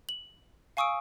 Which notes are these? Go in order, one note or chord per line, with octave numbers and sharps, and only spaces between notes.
F#7
F5 G#5 C#6 D#6 E6 D7